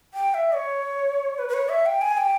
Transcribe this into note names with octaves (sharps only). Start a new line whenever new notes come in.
G5
E5
C#5
B4
B4
C#5
E5
G5
G#5
G5